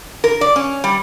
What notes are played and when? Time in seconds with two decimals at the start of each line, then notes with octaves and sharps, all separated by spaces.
0.24 A#4
0.41 D5
0.56 C#4
0.84 G3